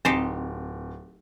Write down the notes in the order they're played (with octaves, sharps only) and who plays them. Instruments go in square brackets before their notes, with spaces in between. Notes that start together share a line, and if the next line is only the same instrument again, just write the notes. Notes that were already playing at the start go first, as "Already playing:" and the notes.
[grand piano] D1 [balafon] C4 [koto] D#4 G4 C5